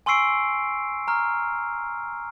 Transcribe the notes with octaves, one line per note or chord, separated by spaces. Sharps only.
G#5 C6 C#6 E6 C7 D7
A#5 C#6 F6